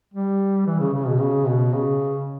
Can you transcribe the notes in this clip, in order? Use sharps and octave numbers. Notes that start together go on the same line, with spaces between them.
G3
E3
C#3
C#3
B2
C#3
B2
C#3